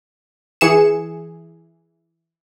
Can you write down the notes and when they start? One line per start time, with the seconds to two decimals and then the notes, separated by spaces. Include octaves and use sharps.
0.61 E3 G#4 C#7 E7